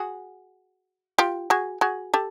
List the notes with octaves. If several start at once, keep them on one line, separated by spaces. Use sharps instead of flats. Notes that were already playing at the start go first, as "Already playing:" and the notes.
Already playing: F#4 G#4
F4 G4
F#4 G#4
F#4 G#4
G4 A4